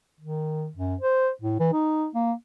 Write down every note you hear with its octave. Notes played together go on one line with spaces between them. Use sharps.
D#3
F#2
C5
A2
E3
D#4
A#3